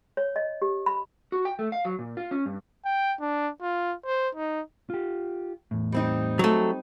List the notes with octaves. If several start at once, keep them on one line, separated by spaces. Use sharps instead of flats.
C#5
D#5
G4
B5
F#4
G5
A3
F5
F#3
A#2
F4
C#4
G2
G5
D4
F4
C5
D#4
F4 G4
E2 A2
G3 C4 D#4
F#3 A3